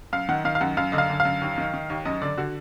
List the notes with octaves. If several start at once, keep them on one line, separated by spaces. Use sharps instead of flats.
F#2 F5
D#3 F#5
D#3 F5
F5
F#2 F#5
F#2 F5
D3 D#5
F5
D3
F5
F#2
D#2
D#3
D#3
D#2
F#2 D#5
D3 D5
D3 F#4